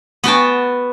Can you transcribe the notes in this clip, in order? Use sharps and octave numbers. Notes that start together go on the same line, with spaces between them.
B3 F#4 G5 A5